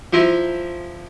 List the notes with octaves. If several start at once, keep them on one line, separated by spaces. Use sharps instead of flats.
F3 E4 C5 E5 A#5